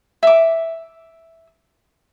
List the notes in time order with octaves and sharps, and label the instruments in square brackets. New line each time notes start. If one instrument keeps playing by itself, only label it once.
[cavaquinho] E5 D6